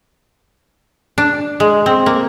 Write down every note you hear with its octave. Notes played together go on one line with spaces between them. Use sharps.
D4
G#3
C4
A#3